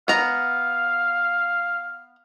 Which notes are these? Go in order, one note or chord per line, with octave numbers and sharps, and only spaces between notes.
B3 F5 A#5